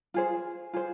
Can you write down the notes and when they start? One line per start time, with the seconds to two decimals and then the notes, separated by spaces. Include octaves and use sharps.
0.14 F4 G#4 C5
0.73 F4 G#4 C5